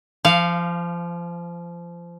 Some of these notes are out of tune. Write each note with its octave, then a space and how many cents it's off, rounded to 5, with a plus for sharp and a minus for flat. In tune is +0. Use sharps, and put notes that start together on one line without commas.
F3 -25 F5 +0